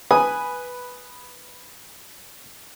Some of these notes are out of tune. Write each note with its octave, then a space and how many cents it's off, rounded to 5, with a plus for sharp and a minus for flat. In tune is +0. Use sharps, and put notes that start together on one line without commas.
B4 +0 G#5 +0 D#6 -5